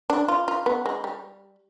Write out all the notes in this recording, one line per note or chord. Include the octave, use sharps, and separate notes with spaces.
D4
F4
F4
B3
G#3
G3